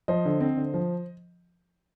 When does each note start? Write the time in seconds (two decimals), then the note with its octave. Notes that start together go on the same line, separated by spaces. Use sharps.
0.08 F3 C5 D#5
0.25 D3
0.41 C4
0.57 D3
0.74 F3